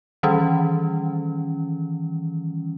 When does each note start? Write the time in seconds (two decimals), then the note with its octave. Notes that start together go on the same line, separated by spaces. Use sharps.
0.23 D#3 E3 G3 C#4